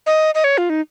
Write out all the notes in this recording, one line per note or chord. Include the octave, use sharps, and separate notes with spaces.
D#5
D#5
C#5
F4
D#4